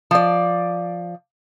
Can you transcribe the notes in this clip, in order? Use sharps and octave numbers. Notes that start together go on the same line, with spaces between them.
F3 D5